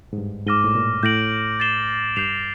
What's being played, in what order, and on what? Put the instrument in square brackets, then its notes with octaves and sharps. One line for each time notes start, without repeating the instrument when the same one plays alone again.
[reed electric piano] G#2
G2
[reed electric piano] G#2 [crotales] D6 F6 A#6 D#7 G7
[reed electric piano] A2
A#2
[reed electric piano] A2 [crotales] G6 A#6 D7 F#7
[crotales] A6 C7 E7 G7
[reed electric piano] G2 [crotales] G6 C7 F7